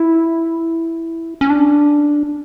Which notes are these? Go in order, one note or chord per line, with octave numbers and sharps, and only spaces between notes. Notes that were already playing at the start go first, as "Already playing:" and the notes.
Already playing: E4
C#4
D4